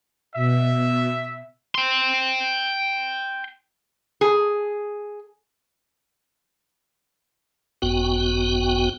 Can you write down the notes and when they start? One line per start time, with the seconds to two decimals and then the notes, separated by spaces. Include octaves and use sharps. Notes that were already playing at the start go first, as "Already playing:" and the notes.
0.35 B2 E5
1.75 G5 C6
4.21 G#4
7.82 G#1 F#2 B3 F#4 G5